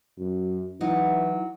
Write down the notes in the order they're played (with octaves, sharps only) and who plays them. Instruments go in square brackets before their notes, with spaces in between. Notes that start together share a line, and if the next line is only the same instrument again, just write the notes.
[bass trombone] F#2
[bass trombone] E3 [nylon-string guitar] F#3 D#4